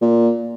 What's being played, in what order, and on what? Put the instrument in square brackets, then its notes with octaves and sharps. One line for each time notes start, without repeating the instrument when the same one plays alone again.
[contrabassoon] A#2